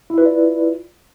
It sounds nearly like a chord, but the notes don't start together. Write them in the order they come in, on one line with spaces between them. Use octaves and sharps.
E4 E5 B4 F4 D5